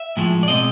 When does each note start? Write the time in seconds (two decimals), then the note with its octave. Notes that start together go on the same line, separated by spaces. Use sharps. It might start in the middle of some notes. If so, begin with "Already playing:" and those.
Already playing: E5
0.17 A2 F3 G#3
0.43 D5
0.48 B2 G#3 C4 D#5